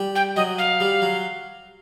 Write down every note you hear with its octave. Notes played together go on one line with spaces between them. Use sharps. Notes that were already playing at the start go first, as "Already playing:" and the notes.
Already playing: G3
G5
F#3 D#5
F5
G3
F#3